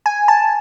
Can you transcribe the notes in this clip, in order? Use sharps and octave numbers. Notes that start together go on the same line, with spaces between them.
G#5
A5